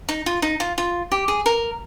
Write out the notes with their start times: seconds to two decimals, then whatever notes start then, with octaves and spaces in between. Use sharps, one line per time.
0.09 D#4
0.26 F4
0.42 D#4
0.60 F4
0.78 F4
1.12 G4
1.28 G#4
1.46 A#4